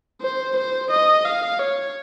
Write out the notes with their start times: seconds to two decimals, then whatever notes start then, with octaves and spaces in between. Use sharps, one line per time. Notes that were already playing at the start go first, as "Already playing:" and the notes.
0.22 C5
0.57 C5
0.91 D#5
1.25 F5
1.60 C#5